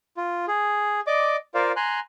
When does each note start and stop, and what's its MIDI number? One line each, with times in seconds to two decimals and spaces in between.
0.17 0.46 65
0.48 1.00 68
1.07 1.36 74
1.07 1.36 75
1.07 1.36 86
1.54 1.72 65
1.54 1.72 70
1.54 1.72 72
1.54 1.72 74
1.54 1.72 77
1.76 2.00 80
1.76 2.00 82
1.76 2.00 84
1.76 2.00 90